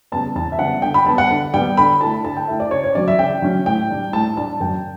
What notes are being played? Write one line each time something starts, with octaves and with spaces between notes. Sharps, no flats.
C#3 G3 B3 A5
E2 A5
E5
C#3 G3 B3 F#5
D3 G5
B5
G3 B3 A5
F#5
D3
G3 B3 G5
D3 B5
A3 E4 A5
D3 A5
G5
A3 E4 E5
D5
C#3 C#5
C#5
F#3 C#4 D5
E5
C#3 G5
F#3 C#4
A2 G5
G3 D4
A2 A5
G3 D4 A5
F#2 G5